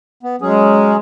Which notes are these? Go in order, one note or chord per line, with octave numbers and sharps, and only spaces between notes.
B3
F#3 G#3 C#4 G#4